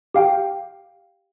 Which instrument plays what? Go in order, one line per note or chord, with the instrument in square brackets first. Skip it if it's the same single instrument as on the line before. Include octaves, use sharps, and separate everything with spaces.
[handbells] G4 F5 G5